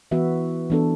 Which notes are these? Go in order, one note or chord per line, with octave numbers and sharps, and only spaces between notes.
E3 B3 F#4 B4 E5
E3 B3 D4 A4